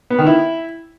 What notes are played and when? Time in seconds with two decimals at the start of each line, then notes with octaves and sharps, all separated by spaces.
0.10 B3
0.18 D#3
0.27 E4